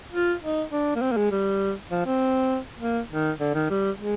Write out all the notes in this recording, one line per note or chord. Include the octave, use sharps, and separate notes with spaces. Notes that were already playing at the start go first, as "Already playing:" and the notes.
F4
D#4
D4
A#3
C4
A#3
G#3
G3
F3
C4
A#3
D#3
D3
D#3
G3
G#3